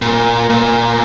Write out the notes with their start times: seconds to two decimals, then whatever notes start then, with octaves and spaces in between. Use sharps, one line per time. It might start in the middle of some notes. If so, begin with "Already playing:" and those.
0.02 A#2
0.50 A#2